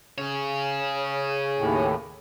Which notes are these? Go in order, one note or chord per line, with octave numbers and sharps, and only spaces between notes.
C#3 G#4 C#5
D#2 A2